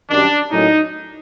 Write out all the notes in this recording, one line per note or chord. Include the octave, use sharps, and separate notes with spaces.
F#2 D#3 G3 D4
A2 F#3 A#3 C#4 D#4